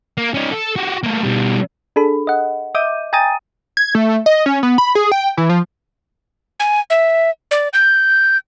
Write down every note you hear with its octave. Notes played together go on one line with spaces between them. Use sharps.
A#3
C#4 D#4
A4
F#4 G4
A3 A#3
B2 G3
D4 G#4 A4 B5
D#5 F#5
D#5 E5 D6 G6 D#7
G5 G#5 A#5 D#6 A6 D#7
G#6
A3
D#5
C#4
B3
B5
G#4
G5
E3
F3
G#5
E5
D5
G6